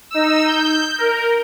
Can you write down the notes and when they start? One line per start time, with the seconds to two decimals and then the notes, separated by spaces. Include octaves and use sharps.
0.11 D#4 E6
0.47 G6
0.98 A#4